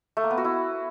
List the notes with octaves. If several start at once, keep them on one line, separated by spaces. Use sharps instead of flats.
A3
A#3
B3
F#4
E4